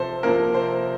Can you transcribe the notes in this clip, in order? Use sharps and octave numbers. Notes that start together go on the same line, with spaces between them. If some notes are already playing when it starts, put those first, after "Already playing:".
Already playing: C3 F3 A4 C5
C3 F3 A#3 A#4
C5